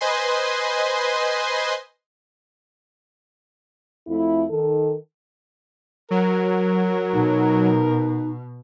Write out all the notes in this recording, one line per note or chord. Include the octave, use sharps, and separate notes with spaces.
B4 C5 D#5 G#5 C6
F2 A3 E4
D#3 A4
F#3 A#4
B2 D#4